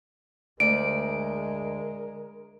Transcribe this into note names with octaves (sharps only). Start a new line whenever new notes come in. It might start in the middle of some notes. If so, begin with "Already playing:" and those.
D2 G#3 A#4 D5 D7